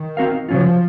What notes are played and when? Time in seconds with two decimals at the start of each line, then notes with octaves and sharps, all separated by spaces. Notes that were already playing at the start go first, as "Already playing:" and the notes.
Already playing: D#3
0.17 C4 F#4 A#4 F5
0.49 C#3 F3 F#3 C#4 F4